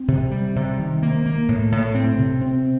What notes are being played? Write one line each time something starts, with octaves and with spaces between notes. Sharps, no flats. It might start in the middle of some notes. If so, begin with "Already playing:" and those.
Already playing: C4
C3
G3
C3
D#3
A#3
A#3
A2
A2
C4
C3
C4